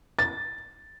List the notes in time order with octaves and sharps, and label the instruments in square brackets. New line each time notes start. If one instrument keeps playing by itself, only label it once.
[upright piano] A6